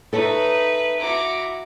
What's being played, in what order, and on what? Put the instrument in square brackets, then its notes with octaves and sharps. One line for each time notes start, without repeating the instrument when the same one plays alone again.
[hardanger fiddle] D#4 [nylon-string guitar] A4 C#5 [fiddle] B4 E5
[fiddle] E4 F#4 [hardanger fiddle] A#5 D6